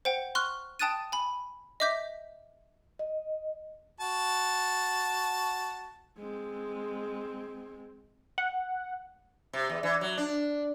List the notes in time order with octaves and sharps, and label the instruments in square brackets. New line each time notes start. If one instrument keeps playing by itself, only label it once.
[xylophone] C5 F#5 G5
C6 C#6 F6 F#6
G5 A5 D#6 F#6 A6 D#7
G#5 B5
D#5 E5 D6 G6 B6
[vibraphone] D#5
[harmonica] F#4 A5
[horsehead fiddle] G#3 C4
[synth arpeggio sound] F#5
[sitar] C3
E2
E3
F#3
D4